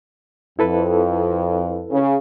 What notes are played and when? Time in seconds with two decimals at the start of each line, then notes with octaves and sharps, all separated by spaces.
0.59 F2 E4 A4 B4
1.90 C#3